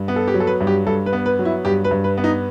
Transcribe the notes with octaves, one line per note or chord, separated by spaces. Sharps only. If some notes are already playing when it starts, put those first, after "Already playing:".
Already playing: G2
B3
A4
G4
F#3
A4
B4
G2
G4
G2 A4
B4
B3
B4
F#3
E4
G2 G4
B4
G2
B4
B3
D#4